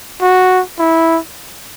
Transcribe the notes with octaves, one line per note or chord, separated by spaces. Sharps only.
F#4
E4